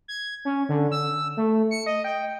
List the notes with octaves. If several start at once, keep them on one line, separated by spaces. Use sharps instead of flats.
G#6
C#4
D3
E6
A3
C#7
D#5
G5